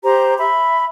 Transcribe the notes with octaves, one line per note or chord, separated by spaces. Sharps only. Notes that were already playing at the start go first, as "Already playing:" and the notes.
G4 C5 A#5
E5 B5